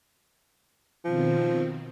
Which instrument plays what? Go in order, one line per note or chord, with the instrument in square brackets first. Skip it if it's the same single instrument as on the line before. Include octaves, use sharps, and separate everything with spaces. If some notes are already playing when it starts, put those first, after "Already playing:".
[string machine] B2 D#3 C4 [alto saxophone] F3